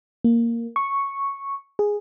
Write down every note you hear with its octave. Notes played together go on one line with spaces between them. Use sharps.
A#3
C#6
G#4